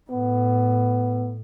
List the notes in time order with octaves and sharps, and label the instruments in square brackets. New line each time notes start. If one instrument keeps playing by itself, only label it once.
[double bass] A2 [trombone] B3